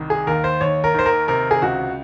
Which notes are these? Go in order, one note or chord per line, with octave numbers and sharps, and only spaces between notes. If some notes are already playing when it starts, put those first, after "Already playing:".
Already playing: C2 D#3
G#4
D#2 A#4
C5
D#2 C#5
A#4
D#3 C5
A#4
C3 A#4
G#4
C#2 F#4